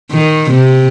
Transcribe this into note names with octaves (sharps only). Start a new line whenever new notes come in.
D#3
C3